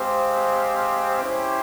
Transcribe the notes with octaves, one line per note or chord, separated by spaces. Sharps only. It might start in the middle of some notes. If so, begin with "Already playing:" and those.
Already playing: G#3 C4 G4 C5 F5
C#4 E4 G4 C5